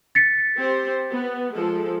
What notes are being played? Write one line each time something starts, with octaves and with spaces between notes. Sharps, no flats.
A6 B6 C#7
C4 G4 C5
B3
F3 G#3 A4